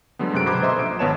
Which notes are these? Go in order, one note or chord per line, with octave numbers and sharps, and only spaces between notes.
D3 F#3 G#3 B3
F#2 C3 F#6 D7
B2 C5 A#5 B5 D6 G#6
A4 C5 D#5 E5 C6
A#1 D7
G#1 B3 B4 C#5 A5 E7